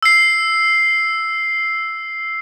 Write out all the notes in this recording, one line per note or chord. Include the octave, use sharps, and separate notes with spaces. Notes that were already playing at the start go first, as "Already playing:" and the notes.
E6 C7